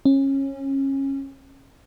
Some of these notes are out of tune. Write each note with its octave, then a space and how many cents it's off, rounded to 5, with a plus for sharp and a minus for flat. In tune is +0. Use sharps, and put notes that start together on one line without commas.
C#4 -25